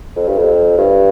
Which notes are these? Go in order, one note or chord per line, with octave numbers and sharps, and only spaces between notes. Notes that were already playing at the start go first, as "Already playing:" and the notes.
F2
G2
F2
G2